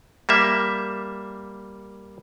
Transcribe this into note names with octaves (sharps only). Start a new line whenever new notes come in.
G3 A#3 E5